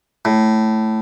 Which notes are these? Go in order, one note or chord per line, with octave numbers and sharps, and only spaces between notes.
A2